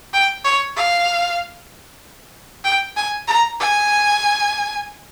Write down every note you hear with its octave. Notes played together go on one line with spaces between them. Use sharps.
G5
C#5
F5
G5
G#5
A#5
G#5